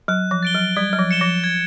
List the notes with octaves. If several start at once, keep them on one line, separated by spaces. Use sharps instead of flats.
F#3 F#6
F3
A6 D7 G7
F#3
G3 G#6
F#3
F3
C#7 E7 G7
F3
G#6